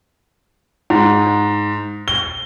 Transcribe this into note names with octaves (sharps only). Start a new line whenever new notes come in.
G#2
G7